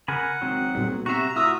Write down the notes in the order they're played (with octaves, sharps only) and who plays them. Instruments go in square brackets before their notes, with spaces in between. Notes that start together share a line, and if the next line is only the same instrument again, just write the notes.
[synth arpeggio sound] C#3 [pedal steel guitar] A#4 G#5 B5 [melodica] F#5
[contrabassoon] G#1 [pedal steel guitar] F#3 C4 D#4
[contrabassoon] B1 [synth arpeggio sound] A#2 G3
[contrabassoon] C3 [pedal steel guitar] F#4 E5 [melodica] A#5 [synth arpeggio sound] C#6 C7
[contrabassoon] A2 [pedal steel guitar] F4 F#4 [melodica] E5 A#5 D#6 [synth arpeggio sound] F6